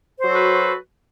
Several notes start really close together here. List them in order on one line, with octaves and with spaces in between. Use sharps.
C5 F#3 F#4 A4 B4